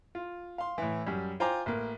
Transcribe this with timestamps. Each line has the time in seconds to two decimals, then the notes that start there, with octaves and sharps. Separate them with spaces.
0.15 F4
0.58 F5 C6
0.78 A2 E3
1.07 F#2 G3
1.40 F4 C5 G5 G#5 A#5 D6
1.66 A1 A#3